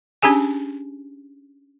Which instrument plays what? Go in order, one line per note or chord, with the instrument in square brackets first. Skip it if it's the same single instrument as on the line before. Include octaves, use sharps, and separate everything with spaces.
[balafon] C#4 D4 G4 G#4 G#5